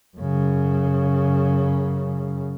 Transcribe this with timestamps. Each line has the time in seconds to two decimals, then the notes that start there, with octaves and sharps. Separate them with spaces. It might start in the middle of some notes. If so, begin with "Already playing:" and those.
0.17 F#2 C#3